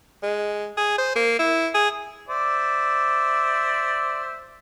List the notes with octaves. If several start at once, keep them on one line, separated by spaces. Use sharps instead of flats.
G#3
G#4
C5
A#3
E4
G#4
C5 D5 E5